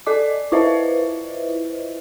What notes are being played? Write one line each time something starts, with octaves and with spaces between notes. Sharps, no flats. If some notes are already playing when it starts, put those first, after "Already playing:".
A4 D5 D#5 D6
E4 F4 B4 C5 D#5 E5